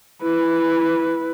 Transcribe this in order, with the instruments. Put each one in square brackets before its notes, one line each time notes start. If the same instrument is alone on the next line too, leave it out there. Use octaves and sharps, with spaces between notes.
[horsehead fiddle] E4 B4